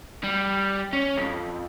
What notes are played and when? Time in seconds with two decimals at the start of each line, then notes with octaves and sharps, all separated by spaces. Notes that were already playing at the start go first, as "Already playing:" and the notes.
0.24 G3
0.93 C#4
1.17 B1 F2